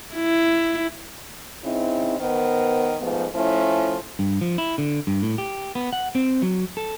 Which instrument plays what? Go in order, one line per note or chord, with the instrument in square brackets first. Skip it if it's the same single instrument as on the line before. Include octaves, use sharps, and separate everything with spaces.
[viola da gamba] E4
[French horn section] C#3 C4 D#4 E4
D#3 B3 A#4 C5
G#2 F3 A3 B3
F3 A3 C#4 E4
[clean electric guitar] G2
F3
E4
D3
G2
A2
G4
B3
F#5
C4
F#3
A4